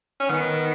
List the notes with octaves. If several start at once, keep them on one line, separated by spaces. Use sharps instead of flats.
C#4
D#3 B3